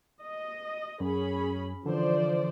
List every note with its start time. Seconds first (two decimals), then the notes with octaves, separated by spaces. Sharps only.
0.24 D#5
1.00 F#2 C#4 G#4 B5
1.86 D3 E3 F3 C5 D5